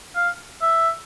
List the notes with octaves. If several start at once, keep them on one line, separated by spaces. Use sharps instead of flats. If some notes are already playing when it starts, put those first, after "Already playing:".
F5
E5